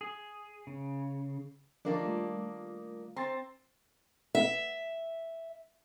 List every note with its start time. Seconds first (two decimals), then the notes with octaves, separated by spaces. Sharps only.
0.01 G#4
0.67 C#3
1.85 D#3 F3 A#3 D4 A#4
2.01 G3 A3 F4
3.16 C4 A#5 C6 A6
4.35 E5